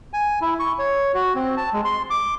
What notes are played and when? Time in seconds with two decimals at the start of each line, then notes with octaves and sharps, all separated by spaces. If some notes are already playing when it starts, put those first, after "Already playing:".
0.13 G#5
0.42 E4
0.60 C#6
0.79 C#5
1.14 F#4
1.35 C4
1.57 A5
1.73 G#3
1.85 C6
2.10 D6